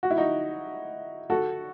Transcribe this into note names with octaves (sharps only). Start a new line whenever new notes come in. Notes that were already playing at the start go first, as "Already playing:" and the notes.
F#4
E4
D#4 F#4
F#4 A4